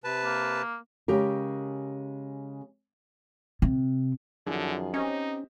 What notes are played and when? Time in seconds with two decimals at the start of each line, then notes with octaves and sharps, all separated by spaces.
0.04 C3 B4 A5
0.25 A#3
1.08 C#3 G#3 G4 A#4
3.62 C3
4.46 F#2 D3 D#3 F3 G#4
4.94 C4 C#4 D#4 G4 D#5